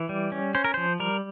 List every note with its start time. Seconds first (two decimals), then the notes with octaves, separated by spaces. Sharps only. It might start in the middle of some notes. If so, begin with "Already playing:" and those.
Already playing: E3
0.09 G3
0.32 C#4
0.55 C#4 C5
0.65 A#4
0.74 F3 C5
1.00 G3 A#4